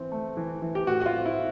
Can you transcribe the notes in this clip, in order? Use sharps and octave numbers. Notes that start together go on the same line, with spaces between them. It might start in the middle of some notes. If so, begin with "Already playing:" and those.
Already playing: E3 C4
A3
E3
E3
G4
A2 F#4
F#4
F4
C4
E4